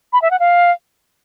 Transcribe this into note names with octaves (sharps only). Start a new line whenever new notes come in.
B5
E5
F#5
F5